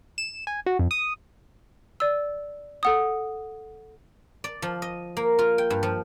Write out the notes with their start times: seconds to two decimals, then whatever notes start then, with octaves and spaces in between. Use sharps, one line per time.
0.18 E7
0.47 G#5
0.66 F#4
0.79 F2
0.91 D#6
2.00 D5 E6
2.83 A4 F#5 D#6
4.44 D5
4.62 F3
4.82 D#5
5.17 A#3
5.39 F4
5.58 G5
5.70 G2
5.83 F3